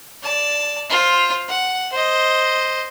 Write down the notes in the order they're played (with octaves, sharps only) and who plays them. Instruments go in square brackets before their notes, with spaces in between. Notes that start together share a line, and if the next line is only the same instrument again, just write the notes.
[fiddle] D5 A5
F4 C5
F#5
C5 D#5